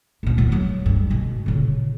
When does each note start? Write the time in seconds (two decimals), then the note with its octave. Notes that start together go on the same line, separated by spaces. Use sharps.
0.23 A#1 B2
0.38 E2 B2
0.52 F#3 A3
0.86 G2
1.10 B2
1.46 A#2 C#3